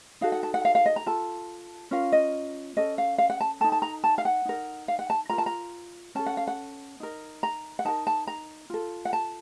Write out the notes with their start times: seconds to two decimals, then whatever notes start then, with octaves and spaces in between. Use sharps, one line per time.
0.21 D#4 F#4 A4 F5
0.32 F#5
0.43 A5
0.54 F#5
0.65 F5
0.75 F5
0.86 D#5
0.96 A#5
1.06 F4 A4 A5
1.91 C#4 F4 A#4 F5
2.12 D#5
2.77 C#4 A4 D#5
2.98 F5
3.18 F5
3.30 F#5
3.41 A5
3.61 A4 A5
3.64 D#4
3.72 A5
3.82 A#5
4.04 A5
4.18 F5
4.25 F#5
4.45 D#4 A#4
4.88 F5
4.99 F#5
5.10 A5
5.30 F4 A#4 A#5
5.38 A5
5.46 A#5
6.15 C#4 A4 A5
6.26 F#5
6.37 F5
6.47 F#5
7.00 D#4 A#4
7.43 A#5
7.79 F#5
7.85 D#4 A#4 A5
8.07 A5
8.27 A#5
8.70 F4 A4
9.05 F#5
9.13 A5